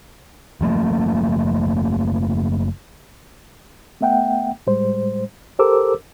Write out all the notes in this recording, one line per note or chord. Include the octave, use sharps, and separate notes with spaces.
F#1 F3 A3 A#3
A3 B3 E5 F#5 G5
A2 G3 G#3 C5
G4 A4 A#4 C5 D6 E6